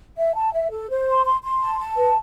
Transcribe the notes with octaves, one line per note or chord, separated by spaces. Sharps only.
E5
A5
E5
A4
C5
C6
C6
C6
A5
A5
B4